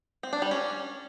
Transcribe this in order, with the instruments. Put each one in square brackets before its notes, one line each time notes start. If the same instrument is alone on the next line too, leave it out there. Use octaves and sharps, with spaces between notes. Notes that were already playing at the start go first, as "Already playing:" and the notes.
[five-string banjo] C4
D4
G3
C#4